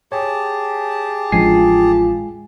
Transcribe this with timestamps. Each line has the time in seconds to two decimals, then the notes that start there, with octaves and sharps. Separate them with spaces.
0.12 G4 G#4 C#5 A5
1.32 A1 F3 G#3 D4 F4 G#5 C7